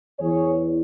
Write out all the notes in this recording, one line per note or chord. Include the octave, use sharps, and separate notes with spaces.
E2 E3 G#4 C#5